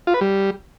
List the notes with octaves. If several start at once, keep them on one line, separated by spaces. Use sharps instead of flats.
F4
B4
G3